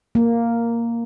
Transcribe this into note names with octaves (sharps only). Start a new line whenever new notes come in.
A#3